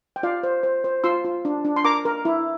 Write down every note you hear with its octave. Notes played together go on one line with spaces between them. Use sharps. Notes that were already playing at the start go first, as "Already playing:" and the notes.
G5
F4 D5 F5
C5
C5
C5
F4 C6 E6
F4
D4
D4
C6
A#4 A#5 D6
A#4
E4